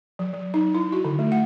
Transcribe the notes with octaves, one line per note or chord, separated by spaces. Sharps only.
F#3
F#3
D#4
E4
F#4
D3
A3
F#5